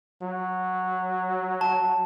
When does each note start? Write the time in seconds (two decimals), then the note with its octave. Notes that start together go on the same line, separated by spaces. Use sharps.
0.22 F#3
1.61 A5